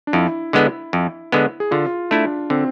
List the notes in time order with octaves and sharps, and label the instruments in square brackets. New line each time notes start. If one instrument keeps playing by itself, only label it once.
[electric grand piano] D4
[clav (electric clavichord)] F2 [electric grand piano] E4
[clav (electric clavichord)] D3 G#3 B3
F2
D3 G#3 B3
[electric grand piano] G#4
[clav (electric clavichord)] D3 [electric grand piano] F4
[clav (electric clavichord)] A3 E4 [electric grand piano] D4
[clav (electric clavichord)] D3 [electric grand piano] C4